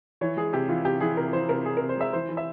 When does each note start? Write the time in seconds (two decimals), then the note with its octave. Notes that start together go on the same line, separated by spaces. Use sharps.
0.21 E3 C#5
0.37 G#3 G#4
0.53 C3 G4
0.69 E3 F4
0.85 C3 G4
1.00 E3 G#4
1.17 C3 A#4
1.33 E3 C5
1.49 C3 A#4
1.65 C3 G#4
1.77 C3 A#4
1.89 C5
1.97 G#3 E5
2.13 E3 C5
2.29 E3
2.37 E5